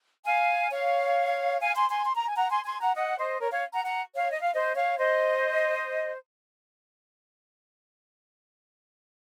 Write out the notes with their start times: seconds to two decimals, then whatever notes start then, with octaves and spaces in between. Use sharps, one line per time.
0.25 F5 G#5
0.70 C#5 F5
1.60 F5 G#5
1.75 G#5 C6
1.89 G#5 C6
2.05 C6
2.15 A#5
2.26 G#5
2.35 F#5 A#5
2.50 G#5 C6
2.64 G#5 C6
2.79 F#5 A#5
2.95 D#5 F#5
3.17 C5 D#5
3.40 A#4 C#5
3.51 C#5 F5
3.73 F#5 A#5
3.85 F#5 A#5
4.15 C#5 F5
4.30 D#5
4.41 F5
4.54 C5 D#5
4.75 C#5 F5
4.97 C5 D#5